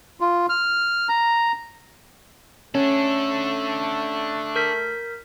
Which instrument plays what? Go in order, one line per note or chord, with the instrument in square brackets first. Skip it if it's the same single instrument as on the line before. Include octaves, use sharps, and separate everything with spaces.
[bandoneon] F4
F6
A#5
[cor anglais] A3 [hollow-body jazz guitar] C#4 [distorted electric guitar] D4 A4
[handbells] A#4 G6 B6